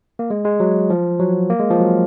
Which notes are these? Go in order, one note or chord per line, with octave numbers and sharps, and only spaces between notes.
A#3
G#3
G#3
F#3
F3
F#3
A#3
G#3
F3
F#3